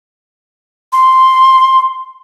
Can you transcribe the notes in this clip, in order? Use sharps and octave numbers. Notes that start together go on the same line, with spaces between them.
C6